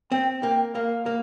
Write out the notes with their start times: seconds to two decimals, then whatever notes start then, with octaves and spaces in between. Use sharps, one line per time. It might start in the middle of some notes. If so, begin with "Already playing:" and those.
0.12 C4 G5
0.43 A#3 G5
0.75 A#3 F5
1.06 A#3